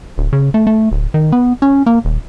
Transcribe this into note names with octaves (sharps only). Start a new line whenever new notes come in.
D1
C#3
A3
A3
D1
D#3
B3
C#4
A#3
D#1